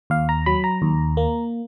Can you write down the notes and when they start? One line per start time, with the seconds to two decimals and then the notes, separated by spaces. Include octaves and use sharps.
0.10 D#2 F5
0.29 A#5
0.46 F#3 B5
0.64 A#5
0.82 D#2
1.17 A#3